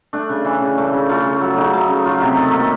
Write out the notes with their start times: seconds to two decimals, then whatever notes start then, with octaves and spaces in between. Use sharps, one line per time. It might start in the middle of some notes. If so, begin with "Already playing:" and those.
0.13 A3 D4
0.29 C#3
0.45 E3
0.61 C#3
0.78 A3
0.93 C#3
1.09 A3 F4
1.25 C#3
1.41 F#3
1.57 C#3 D#4
1.73 A3
1.89 C#3
2.05 F#3 F4
2.21 C3 G4
2.37 D#3 A4
2.53 A#3 A4